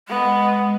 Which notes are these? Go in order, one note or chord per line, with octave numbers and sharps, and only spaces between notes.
G#3 B3